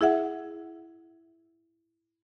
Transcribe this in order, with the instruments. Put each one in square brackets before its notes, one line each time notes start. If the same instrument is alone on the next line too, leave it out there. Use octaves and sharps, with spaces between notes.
[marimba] E4 G#4 E5 F#5